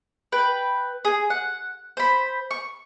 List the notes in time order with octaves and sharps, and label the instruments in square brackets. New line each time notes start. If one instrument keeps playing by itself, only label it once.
[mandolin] B4 G5
G#4
F#5
C5 B5
C#6